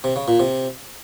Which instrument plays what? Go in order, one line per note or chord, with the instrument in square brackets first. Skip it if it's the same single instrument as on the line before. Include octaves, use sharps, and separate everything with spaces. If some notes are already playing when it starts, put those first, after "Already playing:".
[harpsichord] C3
C#3
A#2
C3